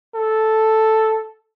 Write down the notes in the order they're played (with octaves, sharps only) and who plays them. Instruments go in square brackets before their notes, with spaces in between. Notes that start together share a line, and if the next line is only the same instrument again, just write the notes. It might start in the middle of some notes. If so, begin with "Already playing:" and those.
[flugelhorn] A4